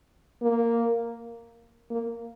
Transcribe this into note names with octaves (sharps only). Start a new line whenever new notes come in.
A#3
A#3